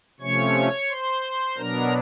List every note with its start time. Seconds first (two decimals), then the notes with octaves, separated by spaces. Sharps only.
0.20 C3 F3 A3 C#4 C#5 C#6
0.89 C5 C6
1.57 B2 F#3 B3 D4 A#4 A#5